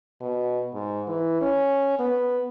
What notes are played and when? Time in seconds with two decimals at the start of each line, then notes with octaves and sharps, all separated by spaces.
0.21 B2
0.74 G#2
1.08 E3
1.41 C#4
1.99 B3